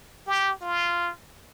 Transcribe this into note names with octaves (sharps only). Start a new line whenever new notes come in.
G4
F4